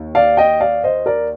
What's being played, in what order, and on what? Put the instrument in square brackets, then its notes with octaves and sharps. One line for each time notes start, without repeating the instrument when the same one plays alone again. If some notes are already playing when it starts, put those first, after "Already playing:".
Already playing: [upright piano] D#2
D5 F5
D#5 G5
D5 F5
C5 D#5
A#4 D5